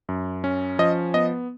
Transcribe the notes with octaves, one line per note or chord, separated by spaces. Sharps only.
F#2
C#4
F3 D#5
B3 D#5